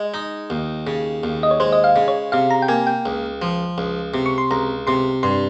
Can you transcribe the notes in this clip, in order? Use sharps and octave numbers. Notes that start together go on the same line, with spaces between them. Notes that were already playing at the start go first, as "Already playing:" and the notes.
Already playing: G#3 D#5
D#4
D#2
C#3
D#2
D#5
C#5
G#3 C5
D#5
F5
C#3
C#5
C3 F5
A#5
G5
A#3 G#5
G5
C#2
F3
C#2
C3
C#6
C6
C#2 A#5
C3 C6
G2 C6